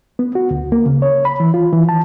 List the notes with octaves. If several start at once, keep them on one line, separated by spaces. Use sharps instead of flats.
B3
F#4
D2
A#3
C#3
C#5
B5
E3
F4
E3
A5